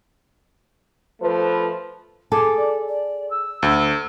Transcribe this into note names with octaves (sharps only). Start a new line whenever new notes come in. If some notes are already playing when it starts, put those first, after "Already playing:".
F3 A3 B4
G#4 A4 D6
D5
D5
E6
D2